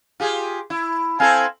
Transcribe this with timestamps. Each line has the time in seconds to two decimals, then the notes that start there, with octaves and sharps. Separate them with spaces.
0.20 F4 G4 G#4
0.70 E4
1.20 C4 E4 A4 F5 G#5